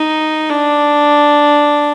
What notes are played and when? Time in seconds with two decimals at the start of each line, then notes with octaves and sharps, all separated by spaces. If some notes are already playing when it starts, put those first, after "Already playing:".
Already playing: D#4
0.50 D4